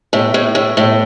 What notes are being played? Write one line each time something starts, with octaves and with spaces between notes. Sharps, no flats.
A2
A2
A2
A2